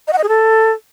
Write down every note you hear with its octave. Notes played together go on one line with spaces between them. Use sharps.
D#5
F#5
D#5
G#4
A4